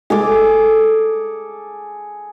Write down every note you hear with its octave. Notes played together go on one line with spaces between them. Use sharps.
G#4 A4 D6